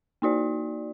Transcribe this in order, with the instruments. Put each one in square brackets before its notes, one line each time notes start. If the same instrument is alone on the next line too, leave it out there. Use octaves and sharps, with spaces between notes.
[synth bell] A#3 D#4 F#4 D5